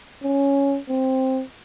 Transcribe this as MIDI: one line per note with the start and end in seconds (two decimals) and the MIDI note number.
0.23 0.78 61
0.89 1.42 60